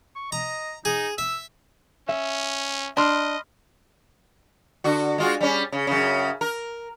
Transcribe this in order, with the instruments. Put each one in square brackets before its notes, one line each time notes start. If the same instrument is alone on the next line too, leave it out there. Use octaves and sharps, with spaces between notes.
[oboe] C#6
[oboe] D#5 [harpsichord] A#5
[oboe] D#4 [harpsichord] G#4
[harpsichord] E5 [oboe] E6
[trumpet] C#4 [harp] E5
[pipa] D4 [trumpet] D#5 [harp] B5 C6 F6
[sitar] D3 F#4
G#3 F4 F#4
G3 C#4
C#3
F#2 C#3
A#4